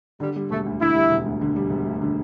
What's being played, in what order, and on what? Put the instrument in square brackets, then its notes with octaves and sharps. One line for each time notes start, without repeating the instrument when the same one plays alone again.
[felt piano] D3 [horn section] G3
[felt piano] G3
[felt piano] E1 [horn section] A3
[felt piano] D2
[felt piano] D3 [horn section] E4
[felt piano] G3
E1
D2
D3
G3
E1
D2
D3